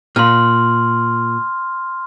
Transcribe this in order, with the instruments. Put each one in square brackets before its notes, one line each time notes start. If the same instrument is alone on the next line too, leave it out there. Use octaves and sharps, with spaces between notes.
[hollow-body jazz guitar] A#2 [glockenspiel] C6 F6